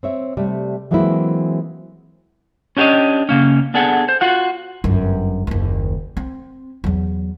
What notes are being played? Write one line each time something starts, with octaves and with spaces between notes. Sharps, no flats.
C4 C#5 E5
C3 G3 A3
E3 F#3 G#3 A#3 C4 E4
C#4 D4 G4 C5 C#5 D#5
C#3 A#3 C#4
B3 D4 G#4 A4 F#5
C5
F4 F#4 F#5
G1 F#2
F#1 D#2
C4
E2 F#3